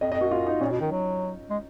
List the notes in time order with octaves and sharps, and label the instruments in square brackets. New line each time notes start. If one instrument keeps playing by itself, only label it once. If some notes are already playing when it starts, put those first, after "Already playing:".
[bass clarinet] F2 [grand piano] D#5
[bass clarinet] F2 [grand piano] D#5
[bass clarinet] F#2 [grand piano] F#4
[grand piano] F4
D#4
[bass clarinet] A#2 [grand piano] C#4
[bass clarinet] B2
[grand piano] D#4
[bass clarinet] D#3
F#3
G#3